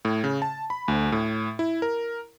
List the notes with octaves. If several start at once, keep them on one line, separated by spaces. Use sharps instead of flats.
A2
C#3
A5
B5
D2
A2
E4
A#4